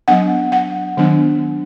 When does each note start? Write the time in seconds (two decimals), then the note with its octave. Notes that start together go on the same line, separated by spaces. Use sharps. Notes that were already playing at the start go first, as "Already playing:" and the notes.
0.08 F#3 B3 D4 F#5
0.52 F#5
0.97 D#3 F#3 B3 D4